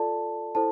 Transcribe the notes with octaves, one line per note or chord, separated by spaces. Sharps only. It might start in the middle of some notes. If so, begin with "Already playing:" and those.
Already playing: F4 A4 D5 A5
E4 A4 C5 A5